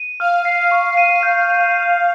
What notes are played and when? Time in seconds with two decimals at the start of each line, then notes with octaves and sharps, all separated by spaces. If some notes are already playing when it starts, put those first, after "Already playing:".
Already playing: D#7
0.20 F5 F6
0.45 C7
0.71 C#6
0.97 D#7
1.23 G6